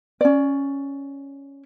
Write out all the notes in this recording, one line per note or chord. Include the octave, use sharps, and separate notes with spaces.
C#4 D5